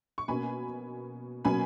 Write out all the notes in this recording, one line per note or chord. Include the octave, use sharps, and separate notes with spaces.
C#6
B2 A#3 C#4 G#5 B5
B2 F#3 A#3 C#4 G#5 B5